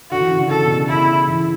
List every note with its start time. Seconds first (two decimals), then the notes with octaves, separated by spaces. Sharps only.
0.11 D3 F#4
0.20 E3
0.30 C#3
0.40 D3
0.49 C#3 A4
0.63 B2
0.76 C#3
0.89 E4
1.27 E3